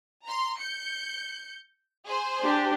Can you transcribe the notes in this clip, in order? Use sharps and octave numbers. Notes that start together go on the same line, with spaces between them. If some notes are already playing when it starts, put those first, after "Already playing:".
A#5 C6
G6 C#7
G#4 C5
D4 G4